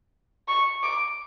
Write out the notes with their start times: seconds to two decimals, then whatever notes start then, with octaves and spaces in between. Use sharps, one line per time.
0.48 C#6
0.83 D6